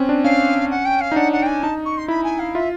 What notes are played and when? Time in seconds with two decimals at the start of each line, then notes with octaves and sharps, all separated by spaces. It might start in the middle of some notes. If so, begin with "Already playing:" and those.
Already playing: C4 C#4
0.09 D4
0.24 C#4 F5
0.71 F#5
0.85 G5
1.01 F5
1.12 D#4
1.16 D4 F#5
1.32 F#5
1.42 G5
1.47 G#5
1.63 D#4 A5
1.85 C#6
1.97 C6
2.08 E4 B5
2.24 G#5
2.39 F5
2.54 F4 E5